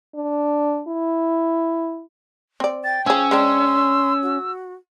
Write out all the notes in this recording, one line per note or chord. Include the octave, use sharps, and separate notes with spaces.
D4
E4
C4 D5
G5 A6
F3 C#4 G#4 E6
G#3 C4 D4 C6
F#4